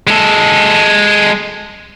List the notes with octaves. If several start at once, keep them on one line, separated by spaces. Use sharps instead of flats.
G#3 A4